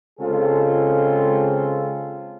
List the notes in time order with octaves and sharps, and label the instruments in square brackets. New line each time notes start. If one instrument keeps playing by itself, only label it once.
[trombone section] C#3 G#3 C4 F4 G#4 A4